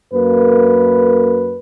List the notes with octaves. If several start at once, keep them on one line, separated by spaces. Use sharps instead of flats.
F#2 A#3 B4